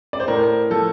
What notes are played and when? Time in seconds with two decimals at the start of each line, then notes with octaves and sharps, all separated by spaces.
0.13 D5
0.20 C5
0.28 A2 A#4
0.71 F3 A4